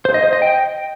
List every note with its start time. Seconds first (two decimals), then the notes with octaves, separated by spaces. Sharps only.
0.05 C5
0.14 D#5
0.24 C5
0.33 D#5
0.42 G5